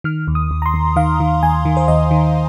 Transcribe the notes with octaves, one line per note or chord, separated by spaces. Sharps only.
D#3 F6
D#2
D#6
D#2
A#5
C6
D#2
D#3 F5
D#3
D#2 G#5
D#3
C5
D#2 D#5
D#3